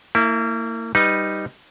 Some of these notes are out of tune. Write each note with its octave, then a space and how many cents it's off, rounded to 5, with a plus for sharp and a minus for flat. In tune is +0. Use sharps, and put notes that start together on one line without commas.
A#3 -35 E4 +0
G3 +0 D#4 +0 B4 +0